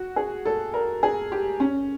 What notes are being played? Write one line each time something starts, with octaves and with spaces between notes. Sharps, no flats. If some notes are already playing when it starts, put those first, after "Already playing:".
Already playing: F#4
G#4
A4
A#4
G#4
G4
C#4